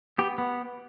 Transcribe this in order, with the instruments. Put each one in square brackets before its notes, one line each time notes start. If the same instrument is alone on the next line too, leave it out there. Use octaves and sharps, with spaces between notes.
[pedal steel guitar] B3 G4
B3